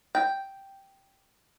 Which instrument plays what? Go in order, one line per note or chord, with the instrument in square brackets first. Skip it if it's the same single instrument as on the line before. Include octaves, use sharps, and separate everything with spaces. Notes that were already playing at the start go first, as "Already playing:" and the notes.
[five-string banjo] G5